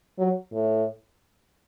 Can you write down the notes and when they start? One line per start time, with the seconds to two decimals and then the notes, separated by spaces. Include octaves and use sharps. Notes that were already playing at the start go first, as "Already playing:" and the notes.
0.18 F#3
0.53 A2